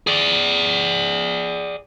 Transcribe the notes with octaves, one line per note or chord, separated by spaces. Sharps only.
G#4 D5